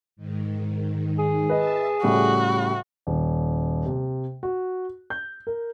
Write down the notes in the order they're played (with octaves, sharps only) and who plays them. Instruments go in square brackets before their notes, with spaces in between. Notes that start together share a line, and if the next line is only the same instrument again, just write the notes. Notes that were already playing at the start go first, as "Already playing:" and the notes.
[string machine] G#2 D#3
[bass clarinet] G#4
[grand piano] B4 D#5 [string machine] E5 A5
[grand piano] A2 C#3 G3 [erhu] F#4 [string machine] F#6
[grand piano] D#1
C3
F#4
G6
A#4